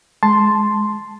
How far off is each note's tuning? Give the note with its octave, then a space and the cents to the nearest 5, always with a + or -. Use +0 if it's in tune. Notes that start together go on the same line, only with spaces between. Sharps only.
G#3 +10 A5 +0 C6 +0